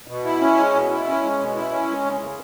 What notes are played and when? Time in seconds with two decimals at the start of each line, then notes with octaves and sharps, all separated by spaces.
0.08 B2
0.24 E4
0.41 C#4
0.58 G#3
0.74 B2
0.90 E4
1.06 C#4
1.23 G#3
1.39 B2
1.55 E4
1.71 C#4
1.88 G#3
2.05 C#3
2.21 C#3